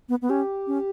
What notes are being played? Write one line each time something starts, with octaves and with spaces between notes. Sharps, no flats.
B3
B3
C#4 G4
C#4